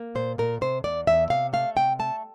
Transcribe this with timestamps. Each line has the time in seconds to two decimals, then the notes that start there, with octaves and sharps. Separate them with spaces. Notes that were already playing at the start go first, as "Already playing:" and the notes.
Already playing: A#3
0.15 A#2 C5
0.38 A#2 A#4
0.61 C3 C5
0.84 E2 D5
1.07 E2 E5
1.30 C3 F5
1.53 A3 F5
1.76 C3 G5
1.99 A3 A5